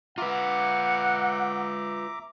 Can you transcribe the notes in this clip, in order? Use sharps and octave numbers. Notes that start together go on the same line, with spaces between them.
F4 B4 E5 F#5 A#5 D6